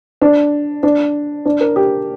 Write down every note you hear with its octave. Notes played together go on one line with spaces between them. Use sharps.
D4
D4
D4
A#4
G4